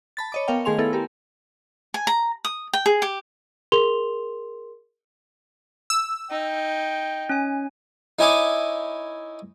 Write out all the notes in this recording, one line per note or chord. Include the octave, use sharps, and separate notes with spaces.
A5 B5 A6
C#5 D#5 D6
B3 A#4 C#5 F5 G5
D#3 A3 G#4 G#5 C6 F7
B3 E4 A4
G4 A#4
G#5
A#5
D#6
G5
G#4
G4
G#4 A#4 C6 F7 G7
E6
D#4 G5
C#4 G#5
D#4 E4 C#5 G#5 D6 D#6